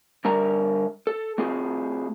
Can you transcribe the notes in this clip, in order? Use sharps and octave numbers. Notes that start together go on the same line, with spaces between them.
D3 G3 A#4 E5 A#5
A4
A3 C4 F4 G#4